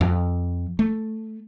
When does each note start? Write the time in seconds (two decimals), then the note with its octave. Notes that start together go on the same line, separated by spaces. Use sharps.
0.01 F2
0.79 A3